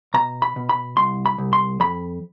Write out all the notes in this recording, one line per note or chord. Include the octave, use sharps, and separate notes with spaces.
B2 A#5
B5
B2
B5
C2 C6
B5
C2
C6
F2 B5